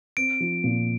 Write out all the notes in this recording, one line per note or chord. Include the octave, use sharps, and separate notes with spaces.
C4 D7
F3
A#2